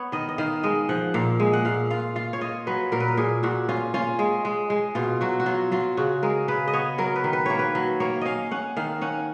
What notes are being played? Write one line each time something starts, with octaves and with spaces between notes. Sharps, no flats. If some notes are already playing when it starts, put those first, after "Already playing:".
Already playing: B3 C#5
D#3 D#5
D#5
D#3 F5
G#3 D#5
F3 F#5
A#2 F5
G#3
F#5
A#2 F5
F4 F5
F4 F5
C#5
F4 D#5
F#3 B4
A#2 A#4
B4
A#4
A#2 G#4
A#2 F#4
C#4 F4
C#4 F4
G#3
G#3
G#3
B2 F4
F#3 F#4
F#4
F#3 F4
F#3 F4
C#3 F#4
G#3 A#4
C#3 B4
D#5
B3 C#5
F#3 A#4
B4
D#3
B4
A#3 C#5
B4
F#3
A#3 C#5
C#4 D#5 F5
C#4 F#5
D#3 F5
C#4 F#5